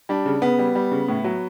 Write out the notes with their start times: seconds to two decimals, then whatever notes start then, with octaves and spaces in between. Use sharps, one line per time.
0.09 G3 D4
0.26 C#3
0.42 C#3 B3
0.59 G3
0.75 G3
0.92 C#3
1.08 A2
1.24 F#3